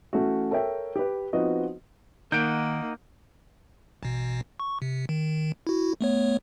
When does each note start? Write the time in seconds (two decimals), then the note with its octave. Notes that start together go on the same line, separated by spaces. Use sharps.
0.13 E3 A3 C#4 F#4
0.51 A4 A#4 C#5 E5 G5
0.96 G4 B4
1.33 F3 B3 C4 D#4 F#4 D#5
2.32 D#3 A#3 D#4 F#5 G6 D7
4.03 A1 B2
4.60 C#6
4.82 C3
5.09 D#3
5.67 E4 F#4
6.01 A3 B3 C#5